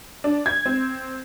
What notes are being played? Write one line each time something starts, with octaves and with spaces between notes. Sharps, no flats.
D4
G#6
C4